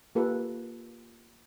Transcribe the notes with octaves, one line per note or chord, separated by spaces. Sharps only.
A#3 F4 G4 A4 B4